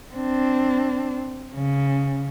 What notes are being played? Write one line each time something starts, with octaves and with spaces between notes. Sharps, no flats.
C4 D4
C#3